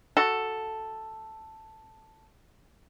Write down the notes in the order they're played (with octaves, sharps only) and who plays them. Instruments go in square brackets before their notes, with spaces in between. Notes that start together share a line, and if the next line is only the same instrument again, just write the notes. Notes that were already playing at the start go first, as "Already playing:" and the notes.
[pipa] F#4 A4